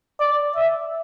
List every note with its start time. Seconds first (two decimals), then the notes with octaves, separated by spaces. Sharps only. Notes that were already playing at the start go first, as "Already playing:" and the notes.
0.20 D5
0.56 E5